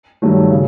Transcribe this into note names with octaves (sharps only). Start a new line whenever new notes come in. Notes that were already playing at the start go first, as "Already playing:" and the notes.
G2 D#3 F#3 A3
C#3